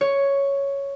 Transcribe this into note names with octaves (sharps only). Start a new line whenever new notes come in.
C#5